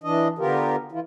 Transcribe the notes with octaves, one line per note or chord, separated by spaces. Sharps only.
E3 D4 D#5
D3 B3 F4 G4 A#4
E3 E4 F4